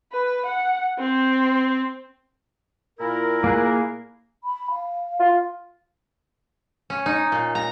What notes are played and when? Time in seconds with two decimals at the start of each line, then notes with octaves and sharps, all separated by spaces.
0.13 B4
0.46 F#5
0.99 C4
2.99 A#2 E4 A#4
3.44 A#3 G#4 F#6
4.44 B5
4.70 F5
5.20 F4 F5
6.90 C#4
7.06 D#4
7.32 A#2
7.55 A#5